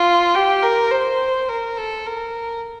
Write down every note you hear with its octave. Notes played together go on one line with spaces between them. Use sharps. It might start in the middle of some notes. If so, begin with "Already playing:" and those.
Already playing: F4
G4
A#4
C5
A#4
A4
A#4